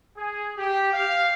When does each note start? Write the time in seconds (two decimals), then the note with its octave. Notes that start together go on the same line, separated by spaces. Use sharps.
0.16 G#4
0.57 G4
0.93 F5